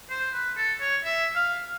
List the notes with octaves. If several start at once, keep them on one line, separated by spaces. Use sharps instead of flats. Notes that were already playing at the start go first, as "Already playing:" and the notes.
C5
B4
A4
C#5
E5
F5